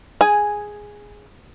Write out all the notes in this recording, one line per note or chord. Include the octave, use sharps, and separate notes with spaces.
G#4 G#5